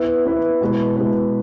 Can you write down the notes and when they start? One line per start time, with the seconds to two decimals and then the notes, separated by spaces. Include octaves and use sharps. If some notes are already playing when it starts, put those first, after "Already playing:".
Already playing: B3 E4 B4 E5
0.25 B3 E4 B4 E5
0.61 B2 G#3 E4 B4
0.97 B2 G#3 E4 B4